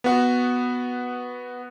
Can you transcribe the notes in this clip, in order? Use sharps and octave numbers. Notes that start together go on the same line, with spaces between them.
B3 F#4